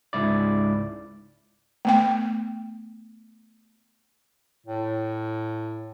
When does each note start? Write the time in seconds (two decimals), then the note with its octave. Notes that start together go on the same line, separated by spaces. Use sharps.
0.13 C#2 G#2 E4 D5
1.85 A3 B3 G5
4.66 A2